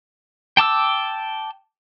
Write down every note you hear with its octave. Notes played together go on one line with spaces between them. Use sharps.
G5 A5 D6 E6